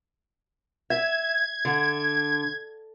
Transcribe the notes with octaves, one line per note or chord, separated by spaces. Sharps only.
E5 G#6
D3